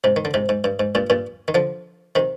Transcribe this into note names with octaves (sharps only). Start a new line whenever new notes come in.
G#2 C3
D#3
D3
G#2 C3
G#2
G2
G#2
G2 A#2
G2 A#2
D#3
D3 F3
C3 D#3